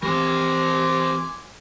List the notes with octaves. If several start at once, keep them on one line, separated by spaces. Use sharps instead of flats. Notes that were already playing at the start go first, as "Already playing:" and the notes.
E3 C4 G4 A#4 C5 G#5 C6 D6